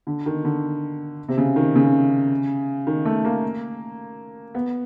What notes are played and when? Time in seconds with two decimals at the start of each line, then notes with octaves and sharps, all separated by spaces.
0.07 D3
0.26 D#3
0.44 D3
1.29 C3
1.38 C#3
1.56 D#3
1.76 C#3
2.87 D#3
3.05 A3
3.25 A#3
4.55 B3